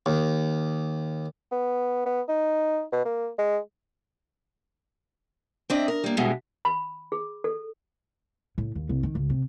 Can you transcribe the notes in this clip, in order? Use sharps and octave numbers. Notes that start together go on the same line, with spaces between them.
D#2
B3
B3
D#4
B2
A#3
G#3
C4 D4 D#5 E5
A#4
G3 A#3
E2 G2 B2 E3 G#3
B5
G#4
A4
A2
D#2
C2
D#3
C#2
C3